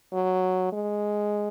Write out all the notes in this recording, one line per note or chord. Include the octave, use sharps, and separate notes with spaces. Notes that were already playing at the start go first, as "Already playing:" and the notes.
F#3
G#3